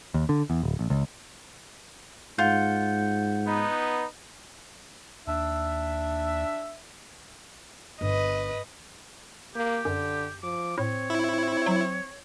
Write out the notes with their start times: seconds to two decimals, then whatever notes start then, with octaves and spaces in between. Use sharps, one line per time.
0.14 D#2
0.29 D3
0.50 E2
0.63 D1
0.79 A#1
0.90 C#2
2.38 G#2 F4 F#5 G6
3.47 B3 D#4 B4
5.27 D#2 D4 E5
8.01 G1 B4 D#5
9.55 A#3 G4
9.85 F#2 D3
10.43 F3 D6
10.78 A2 C4 C#5
11.10 E4
11.66 F#3